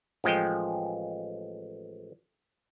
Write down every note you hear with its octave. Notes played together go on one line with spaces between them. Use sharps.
A1 F3 G#3 G5